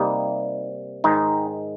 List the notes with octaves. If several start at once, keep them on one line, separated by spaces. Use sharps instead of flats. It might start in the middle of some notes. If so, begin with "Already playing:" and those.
Already playing: C3 G3 A#3 D#4
G#2 D#3 G#3 D#4